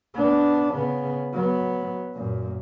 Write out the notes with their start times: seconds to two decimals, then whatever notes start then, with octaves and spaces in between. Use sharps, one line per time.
0.14 B3 D4
0.74 C#3 B3
1.32 F#3 B3
2.14 F#2 A#2